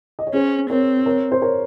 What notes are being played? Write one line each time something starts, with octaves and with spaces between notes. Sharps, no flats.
D#5
C#5
C#4 G#4 C5
C4 A#4 C#5
A#4 C#5
C5
A#4 C#5